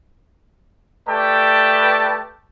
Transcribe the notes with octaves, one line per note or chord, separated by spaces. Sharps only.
A3 G4 B4 D5 G5 A5